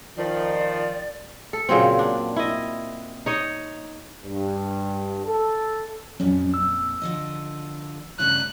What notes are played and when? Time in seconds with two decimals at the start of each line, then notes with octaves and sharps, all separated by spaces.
0.17 D#3 F3 D5
1.53 A4
1.69 A#2 C#3 F#3 C4
1.99 D4
2.36 E4 D#5
3.26 D#4 C#5 D#5
4.24 G2
5.25 A4
6.20 F2 A#2 F#3 C#4
6.54 E6
7.02 D3 F3 D#5
8.19 G2 C#3 A3 F#6